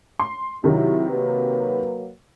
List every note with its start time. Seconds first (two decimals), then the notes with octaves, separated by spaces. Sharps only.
0.19 C6
0.64 C3 D#3 F#3 E4
1.09 F#3 A#3 B4